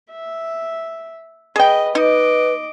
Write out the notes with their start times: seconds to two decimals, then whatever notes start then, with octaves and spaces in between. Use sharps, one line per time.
0.11 E5
1.56 G#4 B4 D#5 G5
1.95 D#4 B4 D#5 D6